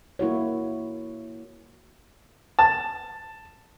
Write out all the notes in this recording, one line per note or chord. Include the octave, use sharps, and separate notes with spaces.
A#3 E4 F#4 C#5
A5